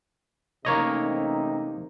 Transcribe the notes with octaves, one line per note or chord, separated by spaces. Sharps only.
A1 C3 A#3 D#4 C#5 D#5